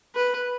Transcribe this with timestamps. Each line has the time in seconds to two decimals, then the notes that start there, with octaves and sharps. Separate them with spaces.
0.15 B4